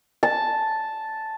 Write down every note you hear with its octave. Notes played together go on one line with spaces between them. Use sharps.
A5